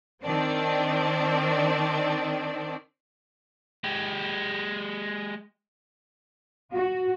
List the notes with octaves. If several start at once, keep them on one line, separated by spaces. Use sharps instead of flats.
D#3 C4 D4 D5
G#3 G4
F#4